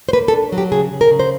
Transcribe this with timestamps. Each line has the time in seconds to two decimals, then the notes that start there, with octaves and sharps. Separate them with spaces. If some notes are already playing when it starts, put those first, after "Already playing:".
0.09 C5
0.13 A#3 B4
0.28 A4
0.33 D4
0.52 F#3
0.58 G4
0.72 C#3 G#4
0.92 C#3
1.01 A#4
1.11 C#3
1.19 C5